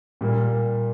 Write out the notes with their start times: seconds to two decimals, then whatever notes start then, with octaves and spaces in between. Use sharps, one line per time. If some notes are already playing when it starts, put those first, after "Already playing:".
0.21 A#2 G3 A#3